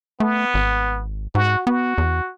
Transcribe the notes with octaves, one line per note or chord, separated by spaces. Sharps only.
A3 B3
G#1
G#2 F#4
B3 F#4
E2